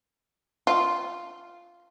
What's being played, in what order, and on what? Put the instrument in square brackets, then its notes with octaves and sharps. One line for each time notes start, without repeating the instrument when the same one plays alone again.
[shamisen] F4